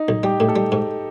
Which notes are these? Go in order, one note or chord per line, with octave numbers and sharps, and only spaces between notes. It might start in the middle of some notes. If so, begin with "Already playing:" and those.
Already playing: D#4
B1
G3 G4
A2
A4
G3
G#2